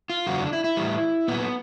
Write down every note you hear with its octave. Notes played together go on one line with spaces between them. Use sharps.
F4
E2 C#3 F#3 F#4
D4
E4
E4
A2 E3 G3
A#2 F#3 B3